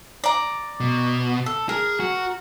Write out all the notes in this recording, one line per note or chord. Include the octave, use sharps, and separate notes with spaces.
D5 A#5
B2
A4
G#4 A#4
F#4